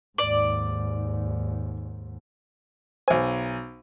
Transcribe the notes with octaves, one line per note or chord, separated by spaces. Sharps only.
D#2 G#2 D5
B1 C5 G#5